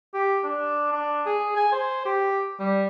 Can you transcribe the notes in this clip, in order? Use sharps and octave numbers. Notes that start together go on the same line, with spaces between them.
G4
D4
D4
G#4
G#5
C5
G4
G3